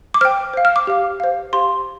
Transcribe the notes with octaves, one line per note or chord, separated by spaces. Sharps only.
D6
C5 G5 F6
C5 F5
F6
D6
G4 F5
C5 F5
G4 C5 F5 C6